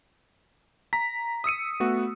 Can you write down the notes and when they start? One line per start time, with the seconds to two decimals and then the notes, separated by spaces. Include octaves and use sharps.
0.93 A#5 B6
1.44 D#6 E6 C#7 D#7
1.80 A3 B3 F#4